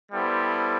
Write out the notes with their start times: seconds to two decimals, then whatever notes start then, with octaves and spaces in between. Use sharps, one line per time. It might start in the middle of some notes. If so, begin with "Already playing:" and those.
0.12 G3 B3 E4 A4 C5